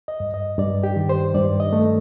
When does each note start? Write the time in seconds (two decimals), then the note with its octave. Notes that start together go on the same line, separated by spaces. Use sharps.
0.08 D#5
0.20 G2
0.34 D#5
0.58 G2 D5
0.83 G4
0.96 D#3
1.09 C5
1.34 G2 D5
1.60 D#5
1.73 A3